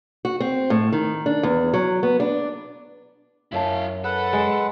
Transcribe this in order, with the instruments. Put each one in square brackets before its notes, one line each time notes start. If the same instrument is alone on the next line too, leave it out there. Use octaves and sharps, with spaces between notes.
[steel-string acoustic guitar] F#4
C4
A2
D#3
D4
E2
F#3
B3
D4
[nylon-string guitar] F#2 E5 A5 [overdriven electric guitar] E4 F5
[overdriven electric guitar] A4 [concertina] B4 F#5
[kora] G#3